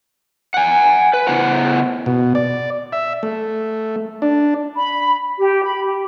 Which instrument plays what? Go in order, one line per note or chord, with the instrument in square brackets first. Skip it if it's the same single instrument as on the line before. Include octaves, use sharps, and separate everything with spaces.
[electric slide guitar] F#5 G#5
B4
C#3 B3 E4 C5 F#5 A#5
[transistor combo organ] B2
D5
E5
A3
D4
[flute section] B5
G4
B5
G4